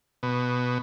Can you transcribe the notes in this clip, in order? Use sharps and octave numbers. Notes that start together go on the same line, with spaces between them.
B2